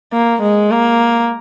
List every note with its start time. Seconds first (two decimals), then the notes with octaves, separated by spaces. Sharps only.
0.13 A#3
0.42 G#3
0.71 A#3